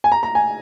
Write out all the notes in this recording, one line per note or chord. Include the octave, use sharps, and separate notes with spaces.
G#5
A#5
A#5
G#5